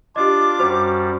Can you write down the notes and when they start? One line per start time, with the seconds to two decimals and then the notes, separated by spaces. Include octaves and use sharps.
0.16 D4 F4 G4 D#5 D6
0.59 F#2 G3 F#4 C5 C#6